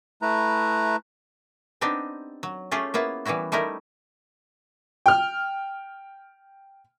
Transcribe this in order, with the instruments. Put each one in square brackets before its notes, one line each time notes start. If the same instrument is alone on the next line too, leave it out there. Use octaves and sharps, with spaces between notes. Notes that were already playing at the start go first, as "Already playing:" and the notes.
[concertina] A3 E4 B4 A#5
[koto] B3 C4 D4 D#4 G4
F#3
A3 C#4 F4 G4 G#4
A#3 B3 E4 F4
E3 G3 B3 E4 F#4
G3 A3 D#4 E4 A#4
[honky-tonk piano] G5 F6